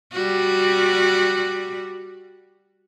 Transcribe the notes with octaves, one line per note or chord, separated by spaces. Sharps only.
G3 F#4